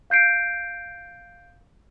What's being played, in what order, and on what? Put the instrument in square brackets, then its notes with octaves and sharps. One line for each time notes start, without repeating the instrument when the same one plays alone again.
[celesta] F5 G6 C7 D7